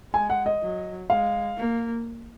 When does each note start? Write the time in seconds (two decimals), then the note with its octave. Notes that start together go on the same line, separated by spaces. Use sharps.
0.13 G#3 G#5
0.30 F#5
0.46 D#5
0.62 F#3
1.10 G#3 F5
1.57 A#3